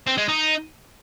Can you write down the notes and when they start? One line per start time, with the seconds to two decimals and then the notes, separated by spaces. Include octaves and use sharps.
0.07 C4
0.18 G#3
0.28 D#4